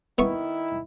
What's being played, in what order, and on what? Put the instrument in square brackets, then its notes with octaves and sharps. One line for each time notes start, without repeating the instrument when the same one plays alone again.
[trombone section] D#3 E4 [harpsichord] B3 E5 C#6